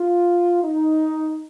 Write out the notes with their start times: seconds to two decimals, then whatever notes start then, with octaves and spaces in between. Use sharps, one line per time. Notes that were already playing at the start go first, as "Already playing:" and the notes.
Already playing: F4
0.63 D#4